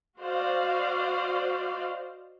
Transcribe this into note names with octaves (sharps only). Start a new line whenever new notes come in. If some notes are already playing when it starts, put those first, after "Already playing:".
F#4 C5 D5 D#5 F5